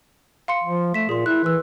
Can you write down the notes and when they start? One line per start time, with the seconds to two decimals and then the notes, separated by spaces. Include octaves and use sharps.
0.48 F5 C6 C#7
0.64 F3
0.94 A3 B6 E7
1.09 A#2 G#4 A#4 C6
1.26 E4 F#6
1.44 E3 B4 E6